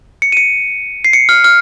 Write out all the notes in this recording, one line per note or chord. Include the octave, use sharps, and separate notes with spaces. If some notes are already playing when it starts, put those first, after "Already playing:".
C#7
D#7
C#7
C7
C#7
F6
F6